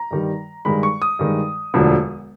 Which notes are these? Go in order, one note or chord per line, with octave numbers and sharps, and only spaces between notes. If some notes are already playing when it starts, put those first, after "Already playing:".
Already playing: A#5
G2 D#3 G3
G2 D#3 G#3 B5
C#6
D#6
G2 D#3 G#3
E1 D2 D3 F3